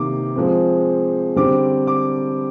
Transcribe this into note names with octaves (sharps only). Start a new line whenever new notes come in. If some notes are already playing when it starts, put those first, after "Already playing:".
Already playing: C3 D#3 A#3 D6
F3 G#3 C4
D3 G3 C4 D6
D6